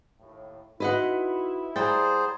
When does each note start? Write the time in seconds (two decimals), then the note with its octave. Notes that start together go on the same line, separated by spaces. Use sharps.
0.20 D#2 A2
0.80 D#4 E4 F#4 B4 D#5 F#5
1.76 G3 G#4 C5 F#5 G5 A#5 A6